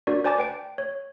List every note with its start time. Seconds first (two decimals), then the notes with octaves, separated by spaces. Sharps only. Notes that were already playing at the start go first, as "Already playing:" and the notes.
0.07 D4 F#4 A#4 D5
0.24 C5 D5 G#5 A5 D6 A6
0.38 B4 G5 D7
0.78 C#5